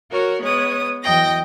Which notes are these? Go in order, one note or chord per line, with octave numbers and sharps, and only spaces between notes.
F#4 A#4 C#5
G#3 B3 C#5 D#6
E2 F#3 D#5 G5 A#6